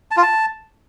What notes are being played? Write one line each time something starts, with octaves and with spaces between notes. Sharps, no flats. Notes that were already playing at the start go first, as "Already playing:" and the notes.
A5
F4
A5